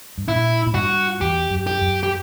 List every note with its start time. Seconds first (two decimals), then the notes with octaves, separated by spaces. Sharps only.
0.18 G2
0.28 A#2 E4
0.67 A#2
0.75 G2 F#4
1.21 E2 G4
1.50 F#2
1.67 G4
1.81 F#2
2.03 G4